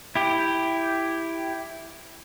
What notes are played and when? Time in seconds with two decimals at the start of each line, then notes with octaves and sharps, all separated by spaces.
0.15 E4 G4